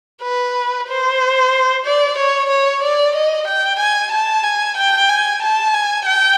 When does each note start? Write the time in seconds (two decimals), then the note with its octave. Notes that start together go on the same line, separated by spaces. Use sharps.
0.22 B4
0.88 C5
1.85 D5
2.18 C#5
2.49 C#5
2.82 D5
3.15 D#5
3.47 G5
3.79 G#5
4.11 A5
4.44 G#5
4.77 G5
5.09 G#5
5.42 A5
5.74 G#5
6.06 G5